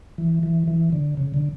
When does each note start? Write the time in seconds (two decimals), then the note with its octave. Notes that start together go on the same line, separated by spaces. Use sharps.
0.18 E3
0.43 E3
0.68 E3
0.92 D3
1.17 C#3
1.34 D3